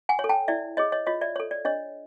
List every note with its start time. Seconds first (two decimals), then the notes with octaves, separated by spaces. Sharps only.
0.09 F#5 G#5
0.19 C#5
0.24 A4
0.29 G5 A5
0.48 E4 D5 E5
0.77 G#4 C#5 D#5
0.92 C#5 D#5
1.06 F4 C#5 D#5
1.21 D5 E5
1.36 A4 C#5
1.51 D5
1.65 D4 C#5 D#5